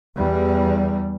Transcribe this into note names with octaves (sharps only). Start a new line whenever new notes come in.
E2 G3